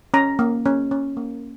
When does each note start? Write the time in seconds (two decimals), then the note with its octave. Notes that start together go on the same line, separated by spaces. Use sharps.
0.14 C#4 A#5
0.39 A#3
0.65 C#4
0.91 C#4
1.17 A#3